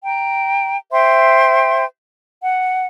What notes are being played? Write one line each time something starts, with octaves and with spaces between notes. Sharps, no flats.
G5 A#5
C5 E5 G5 C6
F#5